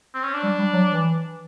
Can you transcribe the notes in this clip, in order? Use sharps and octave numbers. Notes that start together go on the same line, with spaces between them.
C4
C#4
D4
G3
G3
F#3
E3